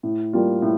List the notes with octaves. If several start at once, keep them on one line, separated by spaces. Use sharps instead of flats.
A2
G3 A#3 F4
A2